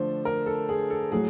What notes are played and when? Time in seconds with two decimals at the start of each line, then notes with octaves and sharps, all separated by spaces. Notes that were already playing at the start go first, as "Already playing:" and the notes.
Already playing: D3 F3 A3 D4 C5
0.25 A#4
0.46 A4
0.69 G#4
0.90 A4
1.12 A2 F#3 A3 G#4